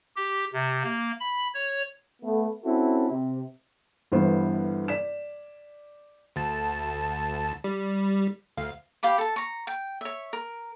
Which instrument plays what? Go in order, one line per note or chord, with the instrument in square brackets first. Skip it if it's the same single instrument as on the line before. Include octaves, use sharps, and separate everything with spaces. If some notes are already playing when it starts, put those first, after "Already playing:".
[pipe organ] G4
C3
A#3
B5
C#5
[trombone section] A3 B3
C4 C#4 E4 F#4 A4
C3
[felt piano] G1 G2 E3 B3 C5
D5 B6 E7
[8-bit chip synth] D2 A5
G3
D2 F5
[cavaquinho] G4 F5 B5 D6
A4 A5
A#5 C#6
G5
C#5 E5
A#4